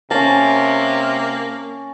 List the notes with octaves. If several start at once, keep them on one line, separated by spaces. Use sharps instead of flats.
C3 A#3 C#4 A5